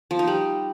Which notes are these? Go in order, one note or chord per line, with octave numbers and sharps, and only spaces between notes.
F3
D#4
G3